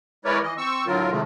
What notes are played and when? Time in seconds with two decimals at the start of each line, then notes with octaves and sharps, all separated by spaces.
0.25 G#3 E4 A#4 B4 C#5 D5
0.43 E3 D#5
0.58 C4 C#6 E6
0.86 A2 D3 F#3 F4 A#4
1.10 A2 C3 D#3 G#3 A3